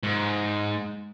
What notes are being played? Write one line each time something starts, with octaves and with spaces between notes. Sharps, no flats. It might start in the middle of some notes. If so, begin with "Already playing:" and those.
G#2